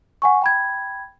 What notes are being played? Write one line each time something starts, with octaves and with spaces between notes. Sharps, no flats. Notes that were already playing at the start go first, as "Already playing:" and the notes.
F#5 G#5 C#6
G5 B5 G#6